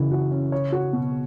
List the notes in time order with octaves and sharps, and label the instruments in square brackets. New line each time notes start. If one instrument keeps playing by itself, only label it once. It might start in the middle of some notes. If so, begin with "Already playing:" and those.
Already playing: [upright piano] F#2 E3 [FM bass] C#3
[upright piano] F#4
C#4
C#5
F#4
B2